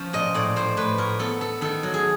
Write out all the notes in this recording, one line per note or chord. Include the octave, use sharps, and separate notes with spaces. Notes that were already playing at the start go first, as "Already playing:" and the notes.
Already playing: F3 C#4
A#2 D#5
A2 D5
A2 C5
A2 B4
A2 A#4
B3 A4
B3 A4
D#3 A4
F#3
G#4